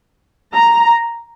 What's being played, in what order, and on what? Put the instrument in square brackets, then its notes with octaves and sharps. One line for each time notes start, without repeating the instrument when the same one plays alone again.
[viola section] A#5